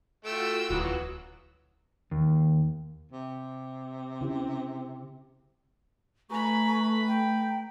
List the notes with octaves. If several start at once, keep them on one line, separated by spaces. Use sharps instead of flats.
A3 F4 F#4 G5 E6
D1 E3 F#3 B3
D#2
C3
C#3 E4 G4
A3 B4 G#5 A#5 B5 C#6
G5 A#5